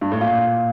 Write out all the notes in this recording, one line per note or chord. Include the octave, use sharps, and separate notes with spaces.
G2
A2
A#2 F5